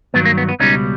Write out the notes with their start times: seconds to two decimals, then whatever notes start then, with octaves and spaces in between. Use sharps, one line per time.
0.14 G2 D#3 F#3 B3
0.25 A#3
0.38 B3
0.49 B3
0.60 C#2 B2 G3 C#4 D#4